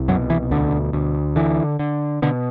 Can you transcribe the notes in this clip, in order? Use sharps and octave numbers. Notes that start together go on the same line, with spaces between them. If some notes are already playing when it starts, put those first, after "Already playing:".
Already playing: C2
F#2 B2 F#3
E3
D2 D3
D2
D3 E3
D3
B2 D3